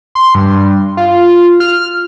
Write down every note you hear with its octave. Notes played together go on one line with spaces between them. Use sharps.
C6
G2
F4
F6